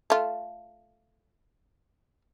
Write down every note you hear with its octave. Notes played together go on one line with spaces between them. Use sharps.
A3 F4